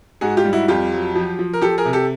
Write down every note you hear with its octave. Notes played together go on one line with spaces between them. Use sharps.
G#2 F#4 G#4
F4 G4
G3
E4 F#4
F2 F4 G4
F#3
F3
F3
A#4
F3 G4 A4
G#4 A#4
C3
G4 A4